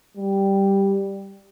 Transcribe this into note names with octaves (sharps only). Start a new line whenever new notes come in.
G3